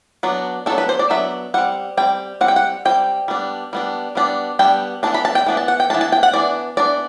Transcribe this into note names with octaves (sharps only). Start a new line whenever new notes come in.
F#3 B3 D4
F#3 B3 D4 A4
B4
C5
D5
F#3 B3 D4 E5
G3 C4 F#5
G3 C4 G5
G3 C4 F#5
G5
F#5
G3 C4 G5
G3 B3 D4
G3 B3 D4
G3 B3 D4
G3 B3 D4 G5
E3 B3 D4 A5
B5
A5
G5
E3 B3 D4
A5
F#5
G5
E3 B3 D4 A5
A5
G5
F#5
E3 B3 D4 D5
E3 B3 D4 D5